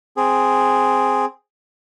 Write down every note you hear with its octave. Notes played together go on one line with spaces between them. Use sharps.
C4 G#4